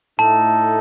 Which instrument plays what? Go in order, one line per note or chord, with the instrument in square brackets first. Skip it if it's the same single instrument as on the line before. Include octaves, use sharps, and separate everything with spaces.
[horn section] A2 A3 D#4 A4 [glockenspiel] A5